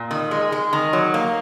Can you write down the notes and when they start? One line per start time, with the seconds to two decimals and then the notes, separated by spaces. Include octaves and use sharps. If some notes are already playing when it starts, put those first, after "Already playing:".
Already playing: A#2
0.11 D#3
0.31 G#3
0.52 G#3
0.73 D#3
0.93 F#3
1.14 A#3